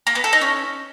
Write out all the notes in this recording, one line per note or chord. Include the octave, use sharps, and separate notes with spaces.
A#3
B3
A4
D#4
C#4